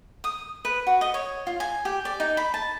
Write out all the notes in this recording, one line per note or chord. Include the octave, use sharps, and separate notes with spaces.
D#6
B4
F#4
D#5
C#5
F4
G#5
G4
D5
D#4
B5
A5